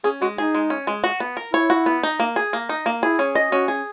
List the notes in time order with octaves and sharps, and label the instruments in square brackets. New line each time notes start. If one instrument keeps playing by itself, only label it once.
[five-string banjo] C#4 [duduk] G#4
[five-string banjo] G#3 [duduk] F#4
[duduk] D#4 [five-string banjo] G#4
[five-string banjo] G#3
C#4
G#3
F#4
B3
A#4
[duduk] E4 [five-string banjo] C#5
[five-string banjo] F#4
B3
D#4
A#3
G#4
A#3
D#4
A#3
[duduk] E4 [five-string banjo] G#4
[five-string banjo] C#4
D#5
[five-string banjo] C#4 [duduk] F#4
[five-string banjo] G#4